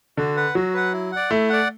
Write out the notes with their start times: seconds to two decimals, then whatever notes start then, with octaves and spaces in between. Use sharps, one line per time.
0.17 D3 F#4
0.36 B4 F#5
0.55 F#3 F#4
0.74 B4 F#5
0.93 E4
1.12 D5 F#5
1.31 A3 E4
1.49 D5 F#5